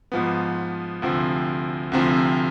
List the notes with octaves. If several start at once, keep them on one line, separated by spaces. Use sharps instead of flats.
G#2 F3 B3
D2 C3 F3 C4
D2 C3 F3 C4